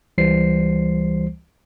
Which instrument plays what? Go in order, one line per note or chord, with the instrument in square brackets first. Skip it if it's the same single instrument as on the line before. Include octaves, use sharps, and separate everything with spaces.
[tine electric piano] C#2 E3 G3 C5 C7